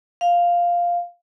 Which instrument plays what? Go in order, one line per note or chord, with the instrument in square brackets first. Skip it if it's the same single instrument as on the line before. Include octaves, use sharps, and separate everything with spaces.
[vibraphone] F5